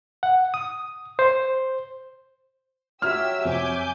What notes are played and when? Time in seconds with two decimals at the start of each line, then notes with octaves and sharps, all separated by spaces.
0.23 F#5
0.54 D#6
1.19 C5
3.02 F#3 G4 C#5 E5 E6 F6
3.45 F2 C3 G#5 D6 G6